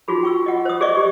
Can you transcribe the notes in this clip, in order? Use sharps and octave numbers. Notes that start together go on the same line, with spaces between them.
D#4 F4 F#4 G#4 B5
G5 C#6 E6
F4 D#5 F#5
C5 D#6
G#4 C5 D5 D#5 C#6
G4